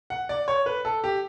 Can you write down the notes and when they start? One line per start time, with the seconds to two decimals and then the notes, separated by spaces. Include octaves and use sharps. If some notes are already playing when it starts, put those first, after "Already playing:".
0.10 F#5
0.29 D5
0.48 C#5
0.66 B4
0.85 A4
1.04 G4